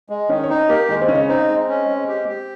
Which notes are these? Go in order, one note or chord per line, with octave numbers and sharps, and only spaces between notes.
G#3
D#3 C#4 C#5
C#5
C4 D#4 C5
A#3 G4 A#4
D#3 G#3 D#4
C4
C#3 C#4
C4 D#4
G#3
C#4
G#3
G4
G4